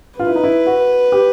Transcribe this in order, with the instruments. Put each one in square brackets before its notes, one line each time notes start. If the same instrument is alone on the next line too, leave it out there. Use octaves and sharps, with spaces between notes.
[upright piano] F4 [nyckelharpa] B4
[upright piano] E4
D#4
E4
F#4
G4